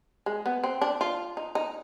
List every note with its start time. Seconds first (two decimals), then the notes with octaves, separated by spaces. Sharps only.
0.26 G#3
0.46 B3
0.64 C4
0.81 D4
1.01 F4
1.37 D#4
1.55 D#4